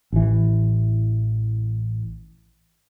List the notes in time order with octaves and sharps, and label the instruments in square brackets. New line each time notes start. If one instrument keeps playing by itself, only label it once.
[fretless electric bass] A1 E3